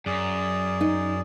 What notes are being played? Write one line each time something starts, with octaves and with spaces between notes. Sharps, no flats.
F#2 G#4 D5
D#4